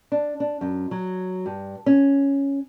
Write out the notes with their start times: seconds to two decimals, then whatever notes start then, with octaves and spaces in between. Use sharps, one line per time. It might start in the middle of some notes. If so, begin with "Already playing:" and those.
0.12 D4
0.40 D4
0.61 F#2
0.91 F#3
1.46 G2
1.86 C#4